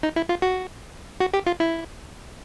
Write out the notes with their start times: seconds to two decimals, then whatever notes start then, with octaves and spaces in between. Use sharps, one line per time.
0.03 D#4
0.16 E4
0.29 F4
0.42 F#4
1.20 F#4
1.34 G4
1.46 F4
1.60 E4